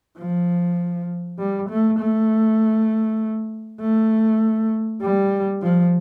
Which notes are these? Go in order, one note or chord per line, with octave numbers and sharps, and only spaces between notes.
F3
G3
A3
A3
A3
G3
F3